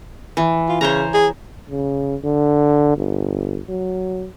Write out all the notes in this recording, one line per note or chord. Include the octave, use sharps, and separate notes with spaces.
E3
F4
C#3 C5 C#5 A#5
G#4
C#3
D3
G1
F#3